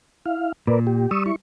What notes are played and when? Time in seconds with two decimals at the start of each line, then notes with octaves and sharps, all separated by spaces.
0.26 E4 F5
0.67 A#2 A#4 B4 D5
0.87 G4
1.11 G3 C#6 D#6 E6
1.26 E4 C#6